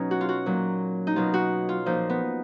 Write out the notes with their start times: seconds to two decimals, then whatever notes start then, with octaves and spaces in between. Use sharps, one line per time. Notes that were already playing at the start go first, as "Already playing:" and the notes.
Already playing: B2 F#3 C#4 D#4
0.11 F#4
0.21 F4
0.29 F#4
0.46 A#2 F#3
1.07 D#4
1.16 B2 F#3 F4
1.34 F#4
1.69 F4
1.86 A#2 F3 D#4
2.09 B3